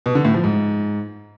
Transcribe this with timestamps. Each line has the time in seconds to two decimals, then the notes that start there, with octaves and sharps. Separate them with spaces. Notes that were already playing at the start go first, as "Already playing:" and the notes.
0.06 B2
0.15 D3
0.25 A2
0.34 F3
0.44 G#2